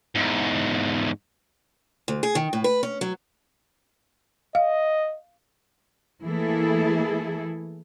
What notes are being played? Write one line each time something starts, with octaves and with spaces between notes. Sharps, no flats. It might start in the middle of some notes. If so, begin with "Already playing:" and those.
E2 G#2
D2
G#4
D#3
A2
B4
C#4
F#3
D#5 F5
E3 A3 A#3 E4 G#4 A4